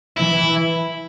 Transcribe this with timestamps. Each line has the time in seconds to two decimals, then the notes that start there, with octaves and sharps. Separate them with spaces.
0.17 E3 E4